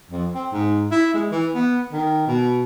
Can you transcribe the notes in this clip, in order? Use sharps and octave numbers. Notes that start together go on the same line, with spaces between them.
F2
C4
G#2
E4
G#3
E3
B3
D#3
B2